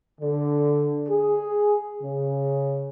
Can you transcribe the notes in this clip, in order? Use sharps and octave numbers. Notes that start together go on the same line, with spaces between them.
D3
G#4
C#3